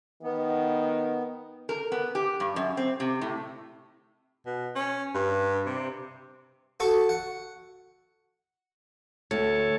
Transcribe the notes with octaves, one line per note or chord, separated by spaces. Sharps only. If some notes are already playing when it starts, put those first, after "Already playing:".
D#3 B3
A#4
B3
G4
G2
F#2
C4
C3
A2
B2
C#4
G2
C3
F#4 A4 C#6
F#5
D2 A4 C#5